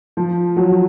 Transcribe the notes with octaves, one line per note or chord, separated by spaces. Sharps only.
F3
F#3